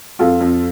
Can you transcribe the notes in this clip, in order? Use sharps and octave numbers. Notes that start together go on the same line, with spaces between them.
F2 F4 A4
F2